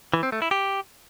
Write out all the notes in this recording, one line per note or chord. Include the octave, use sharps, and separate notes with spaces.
E3
C4
A3
E4
G4